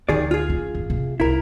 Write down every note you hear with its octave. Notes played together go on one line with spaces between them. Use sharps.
D2 D#3 G#4 D5
F4 G#4
C#4
G#1
C3
C2 E4 A#4